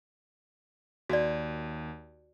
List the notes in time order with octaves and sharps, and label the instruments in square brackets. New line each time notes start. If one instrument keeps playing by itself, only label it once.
[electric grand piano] D#2 [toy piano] F#4 D5